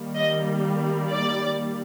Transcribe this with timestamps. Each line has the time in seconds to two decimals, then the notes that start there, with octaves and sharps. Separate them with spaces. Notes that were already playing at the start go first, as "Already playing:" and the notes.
Already playing: D#3 G3 A#3
0.16 D#5
1.10 D5